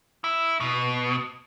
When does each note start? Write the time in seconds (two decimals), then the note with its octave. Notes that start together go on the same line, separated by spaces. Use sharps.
0.24 E4
0.60 B2